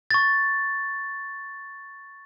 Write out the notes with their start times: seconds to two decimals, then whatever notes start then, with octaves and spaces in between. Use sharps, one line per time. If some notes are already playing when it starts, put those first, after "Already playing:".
0.11 C#6 A6